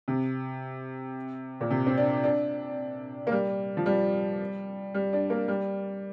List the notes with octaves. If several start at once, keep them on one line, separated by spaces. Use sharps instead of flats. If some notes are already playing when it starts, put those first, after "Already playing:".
C3
A#2
C3
C4
D4
D4
A#3
G3
F3
G3
G3
D4
A#3
G3